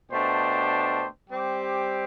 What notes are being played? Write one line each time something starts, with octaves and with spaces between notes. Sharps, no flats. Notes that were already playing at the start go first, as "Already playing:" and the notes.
B2 A3 D4 G4 C5
G3 C4 G4